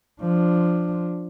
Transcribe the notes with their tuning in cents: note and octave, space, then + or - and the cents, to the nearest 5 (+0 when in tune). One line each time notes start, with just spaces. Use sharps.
F3 +0 D4 +5